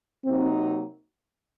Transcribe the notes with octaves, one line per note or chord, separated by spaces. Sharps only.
C3 F#3 A#3 C4 D#4